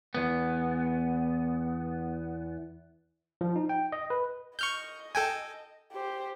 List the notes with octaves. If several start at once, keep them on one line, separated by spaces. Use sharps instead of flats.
E2 B3
F3
D#4
G5
D#5
B4
D#5 C#6 F6 G6
A4 G5 G#5
G4 C5